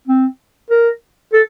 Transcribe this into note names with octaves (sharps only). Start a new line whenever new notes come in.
C4
A#4
A4